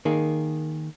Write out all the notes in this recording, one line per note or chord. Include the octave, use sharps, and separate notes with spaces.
D#3 A#3 G#4